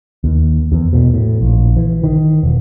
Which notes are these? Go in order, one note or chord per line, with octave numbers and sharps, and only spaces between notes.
D#2
E2
B2
A2
A#1
E3
D#3
E1